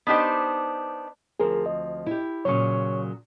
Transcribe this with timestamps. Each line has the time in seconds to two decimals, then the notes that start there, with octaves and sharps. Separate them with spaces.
0.07 B3 D4 D#4 G4 C5
1.40 D2 F3 C4 G#4 A#4
1.66 D#5
2.06 E4 G4
2.45 A#2 C#3 F#3 C#5 C#6